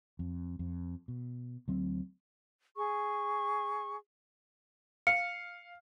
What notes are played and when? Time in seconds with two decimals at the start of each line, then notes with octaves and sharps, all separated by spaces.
0.19 F2
0.59 F2
1.08 B2
1.68 D2 F#3 C4
2.76 G#4 C#6
5.07 F5 C#7